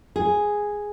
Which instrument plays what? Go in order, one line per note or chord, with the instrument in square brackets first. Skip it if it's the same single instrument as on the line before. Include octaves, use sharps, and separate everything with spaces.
[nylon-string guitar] G#4